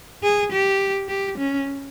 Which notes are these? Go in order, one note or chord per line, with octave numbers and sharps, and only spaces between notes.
G#4
G4
G4
C#4